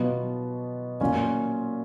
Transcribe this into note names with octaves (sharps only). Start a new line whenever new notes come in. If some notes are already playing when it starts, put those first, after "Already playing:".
Already playing: B2 F#3 B3 F4
A#2 F#3 C#4 F4